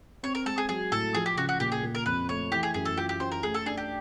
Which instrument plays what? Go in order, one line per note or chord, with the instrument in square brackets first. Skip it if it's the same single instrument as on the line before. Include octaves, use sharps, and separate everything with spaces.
[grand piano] C4 [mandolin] C#5
[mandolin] A#4
[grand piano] G#3 [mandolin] A4
[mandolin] G#4
[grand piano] F#3 [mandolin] G#4
[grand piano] A2 [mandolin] A4
[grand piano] F3 [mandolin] G#4
[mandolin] G4
[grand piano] C#3 [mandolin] F#4
[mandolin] F#4
[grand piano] A#2 [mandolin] G4
[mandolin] G#4
[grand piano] A#2
[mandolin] A#4
[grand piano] F2 [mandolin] B4
[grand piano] A3 [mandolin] C#5
[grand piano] E3 [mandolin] G4
[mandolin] G#4
[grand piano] F#2 [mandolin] G#4
[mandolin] A4
[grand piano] F4 [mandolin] G4
[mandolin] G4
[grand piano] C#4 [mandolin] C5
[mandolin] A#4
[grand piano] A3 [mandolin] G#4
[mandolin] A4
[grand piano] D4 [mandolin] G#4
[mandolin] G4